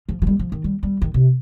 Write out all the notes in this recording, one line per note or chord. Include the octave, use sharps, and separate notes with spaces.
F3
F3
G3
F3
D#3
G3
G3
D#3
C3